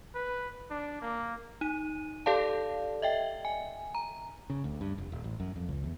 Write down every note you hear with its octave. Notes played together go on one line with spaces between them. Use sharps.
B4
D4
A#3
D#4 D#7
G4 A4 D5 F5 A5
D#5 E5 G5
G#5
A#5
C#3
D2
G2
F1
D#1
A1
F#2
F2
C#2
E2